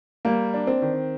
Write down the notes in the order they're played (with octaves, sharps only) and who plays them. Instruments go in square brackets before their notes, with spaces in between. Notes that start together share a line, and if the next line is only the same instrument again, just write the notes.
[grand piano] G3 [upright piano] A#3
[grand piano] D4
[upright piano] C4
[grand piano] D#3